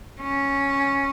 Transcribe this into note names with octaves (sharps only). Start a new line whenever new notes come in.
C#4